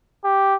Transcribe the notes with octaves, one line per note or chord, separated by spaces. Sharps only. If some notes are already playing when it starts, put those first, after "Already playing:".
G4